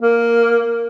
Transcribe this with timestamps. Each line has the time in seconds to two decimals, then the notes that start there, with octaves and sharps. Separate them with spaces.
0.01 A#3